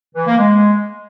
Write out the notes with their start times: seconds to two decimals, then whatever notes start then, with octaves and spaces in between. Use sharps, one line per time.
0.15 E3
0.27 A#3
0.38 G#3